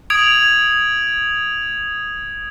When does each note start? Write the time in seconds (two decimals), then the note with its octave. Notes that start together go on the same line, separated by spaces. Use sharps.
0.10 D#6 G#6 D7 F7